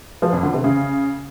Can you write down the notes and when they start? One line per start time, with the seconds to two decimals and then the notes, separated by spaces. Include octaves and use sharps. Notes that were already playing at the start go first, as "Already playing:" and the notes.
0.22 F3
0.33 F2
0.43 D3
0.53 C3
0.64 C#3